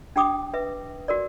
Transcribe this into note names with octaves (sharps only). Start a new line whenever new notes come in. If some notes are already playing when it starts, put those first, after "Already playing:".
D4 G4 G5 D6 D#6
B4 E5
F#4 A#4 D5